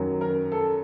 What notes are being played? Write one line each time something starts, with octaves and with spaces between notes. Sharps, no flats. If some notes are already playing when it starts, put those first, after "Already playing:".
Already playing: F#2 D#3 F#3
A#4
A4